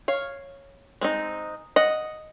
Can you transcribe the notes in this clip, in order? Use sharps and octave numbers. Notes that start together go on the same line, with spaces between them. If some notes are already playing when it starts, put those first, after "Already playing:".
C#5 F5
G#3 C4 D#4
D#5 F#5